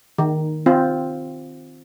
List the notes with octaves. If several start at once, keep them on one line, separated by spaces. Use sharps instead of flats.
D#3
C4 F4